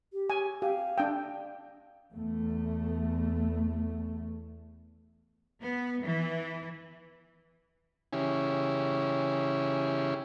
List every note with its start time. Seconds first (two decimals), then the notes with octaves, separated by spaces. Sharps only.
0.13 G4
0.30 G#5
0.62 G4 F5
0.98 D4 G5
2.16 E2 A3
5.62 B3
6.03 E3
8.13 C#3 E3 C#4 E4 G4 G#4